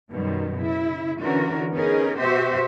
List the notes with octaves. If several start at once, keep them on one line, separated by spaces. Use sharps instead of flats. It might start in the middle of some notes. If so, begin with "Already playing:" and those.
F#2 B2 D#3 G3
C#3 E4
D3 E3 C#4 F#4 A#4
B3 C#4 D#4 G#4 A#4
B2 F#4 G4 C5 E5